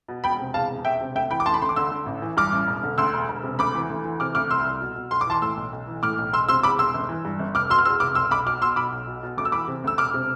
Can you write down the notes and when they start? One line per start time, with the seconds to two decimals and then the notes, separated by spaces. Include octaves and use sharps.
0.08 B2
0.24 E1 G5 B5
0.39 C3
0.54 E2 F5 A5
0.70 E1
0.85 E1 E5 G5
1.01 C3
1.15 D2 E5 G5
1.30 E3 G5 B5
1.40 D6
1.46 D2 A5 C6
1.54 B5
1.62 D2 C6
1.69 D6
1.76 D3 C6 E6
1.91 D3
2.06 A1
2.22 E3
2.37 G2 D6 F6
2.53 A1
2.67 E1
2.83 D3
2.98 D2 C6 E6
3.14 E1
3.29 E1
3.43 C3
3.59 D2 B5 D6
3.75 E3
3.90 D2
4.04 E3
4.20 C3 D6 F6
4.35 D2 D6 F6
4.50 C2 C6 E6
4.66 C2
4.81 B2
4.96 B2
5.11 B1 C6
5.21 D6
5.27 E3 A5 C6
5.42 A2 C6 E6
5.57 B1
5.73 B1
5.87 E3
6.03 A2 D6 F6
6.19 B1
6.33 E1 C6 E6
6.49 C3 C6 E6
6.63 E2 B5 D6
6.78 E1 C6 E6
6.94 G1
7.09 E3
7.25 G2
7.39 G1
7.55 F1 D6 F6
7.70 B2 C6 E6
7.79 F6
7.85 E2 C6 E6
8.00 F1 D6 F6
8.15 B1 C6 E6
8.31 B1 B5 D6
8.46 B2 D6 F6
8.61 B2 C6 E6
8.76 B1 B5 D6
8.92 B1
9.07 B2
9.23 B2
9.37 D2 D6
9.45 E6
9.52 E3 B5 D6
9.68 C3
9.84 D2 E6
9.98 E1 D6 F6
10.14 C3